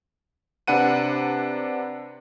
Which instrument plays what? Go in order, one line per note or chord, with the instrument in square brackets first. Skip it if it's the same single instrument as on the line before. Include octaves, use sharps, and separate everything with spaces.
[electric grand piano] C3 D4 B4 F#5 D#7